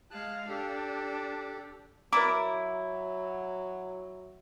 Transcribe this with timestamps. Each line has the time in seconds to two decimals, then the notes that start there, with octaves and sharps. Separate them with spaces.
0.11 G#3 F5 A5 F#6
0.48 D4 G4 A4
2.13 F#3 E4 A#4 D5 A#5 D6